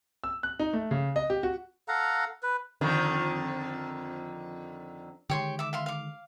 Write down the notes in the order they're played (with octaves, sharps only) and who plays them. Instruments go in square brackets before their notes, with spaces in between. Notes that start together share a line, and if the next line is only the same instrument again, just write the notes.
[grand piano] E6
F#6
D#4
A3
C#3
D#5
G4
F#4
[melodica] A4 F5 F#5 A#5
B4
[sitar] F2 D3 D#3
[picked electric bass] D3 D#3 G#3 [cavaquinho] G4 C#5 C6
[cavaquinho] E5 D6
E5 F5 C6
F5 D6